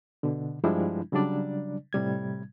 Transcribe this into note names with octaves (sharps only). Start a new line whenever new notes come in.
B2 D3
G2 F3 G3 G#3 D4 E4
C#3 F#3 G3 D4 D5
A2 C3 G3 G#6